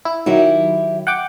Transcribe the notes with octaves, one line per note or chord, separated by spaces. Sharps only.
E4
D#3 F#3 E4 G4
F#5 G5 D6